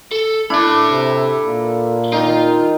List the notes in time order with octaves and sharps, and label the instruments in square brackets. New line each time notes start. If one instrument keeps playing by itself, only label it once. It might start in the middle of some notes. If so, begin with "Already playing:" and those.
[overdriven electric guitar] A4
[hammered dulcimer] D4 E4 [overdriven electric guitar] A4 B5
[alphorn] C3
A#2
[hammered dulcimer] D#3 D#4 [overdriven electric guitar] F4